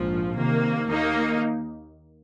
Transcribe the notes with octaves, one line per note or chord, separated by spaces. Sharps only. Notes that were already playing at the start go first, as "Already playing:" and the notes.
Already playing: A#1 G#2 F3
C3 D#3 A#3
D#2 D#3 A#3 D#4